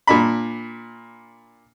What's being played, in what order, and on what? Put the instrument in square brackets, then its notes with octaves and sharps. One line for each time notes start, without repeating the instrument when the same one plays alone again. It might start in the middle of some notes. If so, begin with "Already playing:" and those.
[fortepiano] A#2 D4 B5